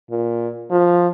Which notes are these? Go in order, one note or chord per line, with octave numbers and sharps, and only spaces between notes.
A#2
F3